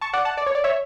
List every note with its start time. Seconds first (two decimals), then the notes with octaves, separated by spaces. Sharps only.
0.01 A5 C#6
0.13 D5 F#5
0.25 F#5 A5
0.37 D5
0.46 C#5
0.55 D5
0.64 C#5 E5